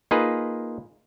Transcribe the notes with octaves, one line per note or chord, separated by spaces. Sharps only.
A#3 D#4 F4 G#4 B4